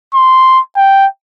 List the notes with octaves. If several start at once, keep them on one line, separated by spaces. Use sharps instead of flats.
C6
G5